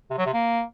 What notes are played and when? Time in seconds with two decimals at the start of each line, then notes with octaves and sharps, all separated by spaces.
0.10 C3
0.18 F#3
0.26 C3
0.33 A#3